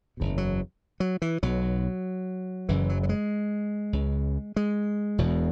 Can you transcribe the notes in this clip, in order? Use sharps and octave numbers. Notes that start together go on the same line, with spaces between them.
F#1 E2 B2
F#3
F#3
E3
B1 B2 F#3
F#1 F#2 C#3 E3
F#3
F#3
G#3
C#2 C#3
G#3
E1 E2 B2